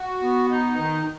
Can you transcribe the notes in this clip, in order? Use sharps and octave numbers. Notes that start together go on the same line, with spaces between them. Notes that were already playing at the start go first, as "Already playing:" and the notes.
Already playing: F#4
B3
D#4
D#3